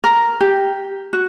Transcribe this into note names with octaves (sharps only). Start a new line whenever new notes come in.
A#4
G4
F#4